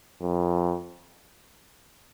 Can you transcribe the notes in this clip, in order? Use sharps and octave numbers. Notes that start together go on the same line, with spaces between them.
F2